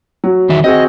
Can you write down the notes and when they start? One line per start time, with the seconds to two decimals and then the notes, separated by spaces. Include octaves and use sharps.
0.24 F#3
0.49 E2 D#3 E5
0.64 C4 F#4 G#4 D#5